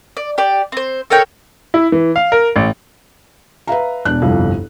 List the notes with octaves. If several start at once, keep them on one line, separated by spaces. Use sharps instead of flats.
D5
G4 D5
C4 C5
A4 A#4 C#5 G5
E4
E3
F5
A#4
A1
B4 E5 F5 A#5
E1 D4 F#6
G1 C2 F2